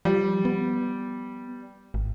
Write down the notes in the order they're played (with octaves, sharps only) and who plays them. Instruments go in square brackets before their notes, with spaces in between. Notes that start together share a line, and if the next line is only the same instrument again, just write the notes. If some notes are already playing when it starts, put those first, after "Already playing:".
[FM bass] F3 [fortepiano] G3
[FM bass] B3
G#1